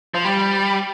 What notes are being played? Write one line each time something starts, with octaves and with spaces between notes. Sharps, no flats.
F3
G3